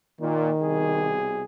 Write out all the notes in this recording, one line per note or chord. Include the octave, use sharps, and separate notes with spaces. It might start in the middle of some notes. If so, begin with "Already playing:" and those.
A#2 D#3
C2 B2 G#4